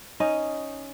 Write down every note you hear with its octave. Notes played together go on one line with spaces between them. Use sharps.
C#4 D#4 D#5